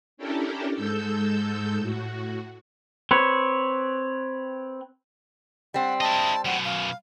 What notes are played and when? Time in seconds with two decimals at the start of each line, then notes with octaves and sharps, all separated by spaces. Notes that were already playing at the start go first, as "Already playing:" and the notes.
0.17 C#4 D4 E4 G4 A4 A#4
0.75 G#2 G#3 A4 E6 G6
1.78 A2 F#4
3.11 C4 B4 C#5
5.74 G3 C4 F#5
6.01 E4 D#5 A5
6.45 F#2 B2 F#5
6.65 F5